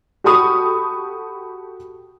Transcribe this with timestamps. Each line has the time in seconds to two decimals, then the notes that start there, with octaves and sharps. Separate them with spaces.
0.24 F#4 G4 A4 B5 C#6 D#6